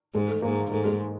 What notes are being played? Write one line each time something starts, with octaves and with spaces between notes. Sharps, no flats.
G#2 G#3
A3
G#2 A#3
G#2 A3
G#3